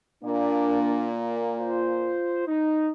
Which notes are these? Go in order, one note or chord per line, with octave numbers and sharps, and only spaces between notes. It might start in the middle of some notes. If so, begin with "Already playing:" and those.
A#2 A#3 D4 D5
F4 C5
D#4